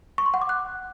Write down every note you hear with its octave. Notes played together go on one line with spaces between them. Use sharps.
C#6
C6
F#5
D6
F#6